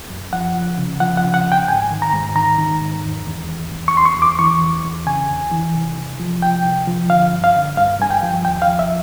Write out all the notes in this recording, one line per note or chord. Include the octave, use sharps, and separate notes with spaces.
F#2
F3 F#5
C#2
C#3
F3 F#5
F#5
C#3
F#5
C#2
G5
G#2 G#5
D#3
A#5
G#2
D#3 A#5
D#3
G#2
E2
E2
E2
E2
C#6
E2 C6
C#6
E2
D6
E3 C#6
E2
E2
C#3 G#5
E2
E3
C2
C2
F3
C2 G5
C2
F3
D3 F5
G2
F5
D3
G2 F5
G2 G#5
G5
F3
D#2 G5
F5
F3
E5